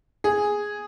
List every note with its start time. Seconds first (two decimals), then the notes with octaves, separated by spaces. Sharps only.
0.24 G#4